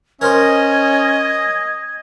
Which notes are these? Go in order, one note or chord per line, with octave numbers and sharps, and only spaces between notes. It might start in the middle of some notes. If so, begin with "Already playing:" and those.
C#4 A#4 C5 D#5 G#6